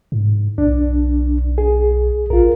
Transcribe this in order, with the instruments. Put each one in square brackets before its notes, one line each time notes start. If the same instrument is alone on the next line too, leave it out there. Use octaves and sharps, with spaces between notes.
[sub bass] G#2
[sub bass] B1 [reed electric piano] D4
[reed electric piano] G#4
[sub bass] A1 [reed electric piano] F4 A#4